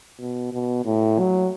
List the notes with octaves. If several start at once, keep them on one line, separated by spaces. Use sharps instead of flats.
B2
B2
A2
F#3